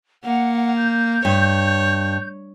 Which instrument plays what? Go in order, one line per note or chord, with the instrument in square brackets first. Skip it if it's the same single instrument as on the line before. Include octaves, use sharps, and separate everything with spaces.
[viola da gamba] A#3 [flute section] F#5
[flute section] G6
[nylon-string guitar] G2 [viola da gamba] C#5